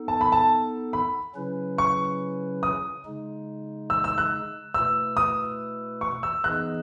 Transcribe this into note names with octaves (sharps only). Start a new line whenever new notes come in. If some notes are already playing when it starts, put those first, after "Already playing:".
Already playing: B3 D#4 A4
A5
B5
A5
B5
C#3 F#3 C#4 E4 B4
C#6
D#6
C#3 G#3 D#4
E6
E6
F#6
B2 A3 E4 B4 E6
D#6
C#6
E6
E3 B3 D#4 G#4 D#5 F#6